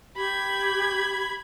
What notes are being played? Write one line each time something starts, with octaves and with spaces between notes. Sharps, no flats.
G4 B5 G#6